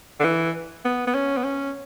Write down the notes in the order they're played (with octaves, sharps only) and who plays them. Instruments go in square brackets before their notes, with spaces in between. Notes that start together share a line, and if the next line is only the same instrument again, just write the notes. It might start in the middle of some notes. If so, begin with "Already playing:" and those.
[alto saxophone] D3
E3
B3
B3
C#4
B3
C#4